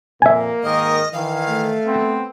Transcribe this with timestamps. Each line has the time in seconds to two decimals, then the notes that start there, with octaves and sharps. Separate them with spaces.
0.22 F2 A#2 A#3 E5 G#5
0.63 G#2 D#3 A#4 D#5
1.13 D#3 E3 F5
1.48 A3
1.86 B3 C4